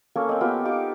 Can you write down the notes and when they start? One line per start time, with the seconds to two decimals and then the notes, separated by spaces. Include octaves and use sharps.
0.16 A#3 C#4 A4 G#5
0.29 C4 D#5
0.41 B3 F4 G4
0.65 D#4 G4 D6